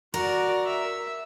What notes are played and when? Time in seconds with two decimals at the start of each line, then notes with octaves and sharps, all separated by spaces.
0.14 F#4 A#4 D5
0.65 E5